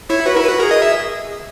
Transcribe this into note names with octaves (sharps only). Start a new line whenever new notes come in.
E4 C#5
F#4 B4
E4 A#4
B4
F#4
G#4 A#4
D#5
E5